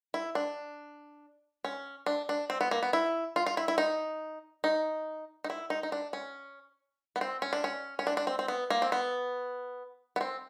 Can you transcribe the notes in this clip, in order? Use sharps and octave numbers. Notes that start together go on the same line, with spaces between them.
E4
D4
C#4
D4
D4
C4
B3
A#3
B3
E4
F4
F4
E4
E4
D#4
D#4
D#4
E4
D#4
D#4
D4
C#4
B3
C4
C#4
D4
C#4
C#4
D4
D4
C4
C4
B3
A#3
C4
B3
B3
C4